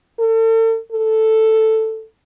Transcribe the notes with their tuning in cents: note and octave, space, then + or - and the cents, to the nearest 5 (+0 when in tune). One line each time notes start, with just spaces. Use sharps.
A4 +40
A4 +5